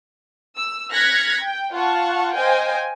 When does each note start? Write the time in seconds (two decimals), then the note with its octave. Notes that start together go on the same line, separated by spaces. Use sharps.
0.55 E6
0.92 F6 F#6 G#6 A#6 B6 C#7
1.41 G5
1.73 F4 F5 F#5 A5 C#6
2.33 C5 D#5 F5 G5 G#5